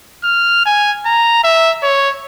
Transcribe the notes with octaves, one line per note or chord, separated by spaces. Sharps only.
F6
G#5
A#5
E5
C#5